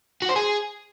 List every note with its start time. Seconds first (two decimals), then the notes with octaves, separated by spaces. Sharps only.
0.22 F#4
0.29 C5
0.36 G#4